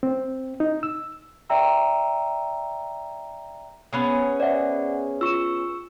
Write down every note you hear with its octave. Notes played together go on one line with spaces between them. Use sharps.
C4
D#4
E6
D5 E5 G5 A#5 E6
B3 C#4 G#4
C5 D5 E5 F#5
F4 C#6 E6 E7